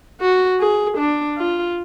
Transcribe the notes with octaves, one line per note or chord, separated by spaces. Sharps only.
F#4
G#4
D4
F4